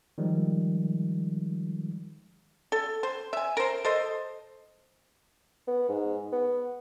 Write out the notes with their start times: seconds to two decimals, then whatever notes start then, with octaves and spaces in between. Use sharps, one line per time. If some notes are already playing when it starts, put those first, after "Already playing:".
0.18 D#3 F3 G3 G#3
2.72 A4
3.03 C5
3.33 E5 G#5
3.57 A#4 C5
3.85 A4 C5 D#5
5.68 B3
5.89 G#2
6.33 B3